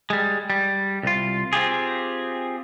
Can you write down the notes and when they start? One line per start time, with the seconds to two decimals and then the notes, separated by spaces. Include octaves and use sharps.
0.10 G3 G#3
0.50 G3
1.03 C2 F4
1.53 C4 F4 G4 G#4